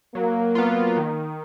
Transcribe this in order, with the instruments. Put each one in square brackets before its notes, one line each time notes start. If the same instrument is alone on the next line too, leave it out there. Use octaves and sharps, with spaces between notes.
[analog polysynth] F#3 [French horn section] A#3
[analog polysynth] B3 F4
D#3